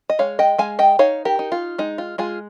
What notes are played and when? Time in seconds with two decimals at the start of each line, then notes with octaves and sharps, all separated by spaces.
0.10 D#5
0.19 G#3 C#5 F5
0.39 D#5 G5
0.58 G#3 F5 G#5
0.79 D#5 G5
0.99 D#4 C#5 F5
1.25 G4 A#4
1.39 D#4
1.52 F4
1.78 G#3 D#4
1.98 F4
2.18 G#3 F4 G#4